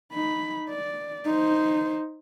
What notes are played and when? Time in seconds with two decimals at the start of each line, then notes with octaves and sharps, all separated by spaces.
0.13 D#4 B5
0.69 D5
1.25 D#4 C5